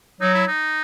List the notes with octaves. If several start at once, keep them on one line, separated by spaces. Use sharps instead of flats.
F#3 D#4
E4
D#4